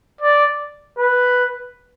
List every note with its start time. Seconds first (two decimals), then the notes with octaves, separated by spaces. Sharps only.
0.21 D5
0.99 B4